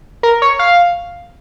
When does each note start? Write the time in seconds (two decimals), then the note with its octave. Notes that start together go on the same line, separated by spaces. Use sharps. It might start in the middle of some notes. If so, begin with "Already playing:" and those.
0.23 A#4
0.42 C#5
0.59 F5